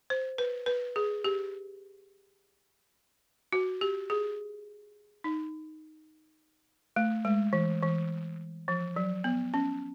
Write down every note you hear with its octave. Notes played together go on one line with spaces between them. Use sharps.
C5
B4
B4
G#4
G4
F#4
G4
G#4
D#4
A3
G#3
E3
E3
F3
F#3
B3
C#4